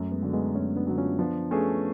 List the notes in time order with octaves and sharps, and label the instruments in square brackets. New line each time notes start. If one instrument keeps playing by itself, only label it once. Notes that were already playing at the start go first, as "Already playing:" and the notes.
Already playing: [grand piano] F#2 [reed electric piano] A3 C#4
[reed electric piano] G#3 B3
[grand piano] D3 F#3
[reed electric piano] G#3 B3
[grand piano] F#2 [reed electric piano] A3 C#4
[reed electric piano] B3 D4
[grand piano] D3 F#3
[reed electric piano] C#4 F4
[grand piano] F3 [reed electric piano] B3 D4
[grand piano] A3 C#4 G#4 B4